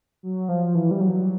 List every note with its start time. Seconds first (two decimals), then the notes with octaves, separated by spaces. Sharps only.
0.23 F#3
0.49 F3
0.75 E3
0.91 G3
1.01 F#3